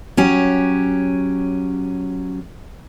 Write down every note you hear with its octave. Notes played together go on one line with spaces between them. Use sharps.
F#3 C#4 G4